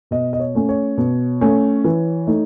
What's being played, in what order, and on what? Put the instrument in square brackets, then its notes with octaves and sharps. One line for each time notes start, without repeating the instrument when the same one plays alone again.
[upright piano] B2 D#5
D#5
C#5
A3 C#4
C#5
B2
A3 C#4
E3
A3 D#4